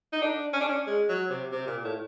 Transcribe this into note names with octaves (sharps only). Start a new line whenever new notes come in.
D#4
D4
C#4
D4
C#4
G#3
F#3
C3
C3
A#2
A2